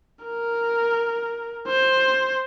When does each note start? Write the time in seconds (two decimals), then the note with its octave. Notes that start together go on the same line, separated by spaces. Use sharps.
0.25 A#4
1.67 C5